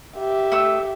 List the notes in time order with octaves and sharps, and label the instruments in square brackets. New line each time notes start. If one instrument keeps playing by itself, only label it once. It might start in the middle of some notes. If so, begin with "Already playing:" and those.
[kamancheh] G4 E5
[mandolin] A3 D#6 E6